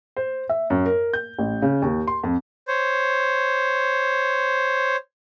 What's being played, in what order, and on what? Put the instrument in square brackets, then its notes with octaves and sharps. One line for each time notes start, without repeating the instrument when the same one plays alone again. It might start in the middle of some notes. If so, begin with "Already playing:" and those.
[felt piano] C5
E5
F#2
A#4
G6
A1
C#3
D#2
C6
F2
[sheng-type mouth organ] C5 C#5